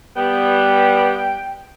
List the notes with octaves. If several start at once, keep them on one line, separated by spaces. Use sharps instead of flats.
G3 B3 G5